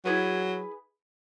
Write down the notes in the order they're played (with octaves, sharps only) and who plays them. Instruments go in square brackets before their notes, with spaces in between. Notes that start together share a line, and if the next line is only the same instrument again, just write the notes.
[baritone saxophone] F#3 [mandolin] E4 G#4 B4